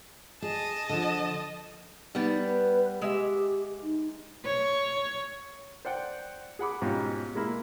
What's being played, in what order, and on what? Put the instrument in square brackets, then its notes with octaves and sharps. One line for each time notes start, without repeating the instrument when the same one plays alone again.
[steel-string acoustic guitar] G#4 [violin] D#5 A5
[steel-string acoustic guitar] D3 F3
[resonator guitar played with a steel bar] G3 B3 [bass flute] D#4
[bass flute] B4
[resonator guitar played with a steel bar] G#3 E5 [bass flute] G4
[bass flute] D#4
[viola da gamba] C#5
[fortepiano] C5 D5 F#5 G5
G#4 F#5 B5 D6
G#2 B2 C#4 F4 G4
B2 G#3 A#3 E4 B5